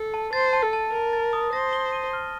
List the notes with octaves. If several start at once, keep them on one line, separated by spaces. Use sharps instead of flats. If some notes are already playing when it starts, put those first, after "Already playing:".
Already playing: A4
A5
C5 A6
A5
A4
A5
A#4 A5
A6
D#6
C5 A#6
G7
D#7
F6